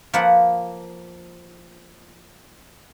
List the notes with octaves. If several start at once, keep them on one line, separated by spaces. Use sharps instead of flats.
F3 A#3 B4 F#5